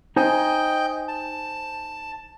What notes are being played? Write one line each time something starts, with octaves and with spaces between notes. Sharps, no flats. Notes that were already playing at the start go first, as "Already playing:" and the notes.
D#4 C5 D#5 G5 G#5
A5